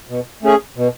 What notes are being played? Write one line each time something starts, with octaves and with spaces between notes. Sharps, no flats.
B2
A3 C#4 G#4
B2